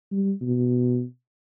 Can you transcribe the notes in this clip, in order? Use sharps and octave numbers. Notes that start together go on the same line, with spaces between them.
G3
B2